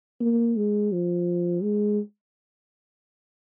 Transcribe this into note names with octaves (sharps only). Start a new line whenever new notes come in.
A#3
G#3
F3
G#3